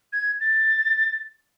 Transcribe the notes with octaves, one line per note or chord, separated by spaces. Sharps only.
G#6
A6